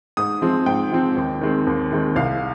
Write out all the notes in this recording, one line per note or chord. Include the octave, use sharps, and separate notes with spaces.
G#2 D#6
F3 G#3 C4
G#2 G5
F3 G#3 C4
D#2
D#3 G#3 C4
D#2
D#3 G#3 C4
C2 F5